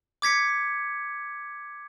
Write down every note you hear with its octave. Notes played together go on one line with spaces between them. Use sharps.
D6 G#6 B6 C#7